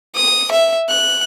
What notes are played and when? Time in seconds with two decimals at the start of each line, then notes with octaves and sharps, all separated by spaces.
0.15 D#6
0.52 E5
0.90 F#6